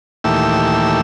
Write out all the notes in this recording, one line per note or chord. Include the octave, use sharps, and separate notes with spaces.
D#2 A#2 E3 A3 G4 E6